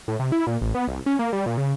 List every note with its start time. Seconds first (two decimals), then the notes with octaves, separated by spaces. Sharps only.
0.08 A2
0.19 C3
0.32 E4
0.47 A#2
0.61 A1
0.75 B3
0.88 C2
1.06 C#4
1.19 A#3
1.33 G3
1.46 A#2
1.57 C#3